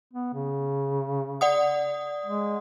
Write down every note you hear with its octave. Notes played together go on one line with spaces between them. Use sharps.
B3
C#3
D5 F#5 D#6
G#3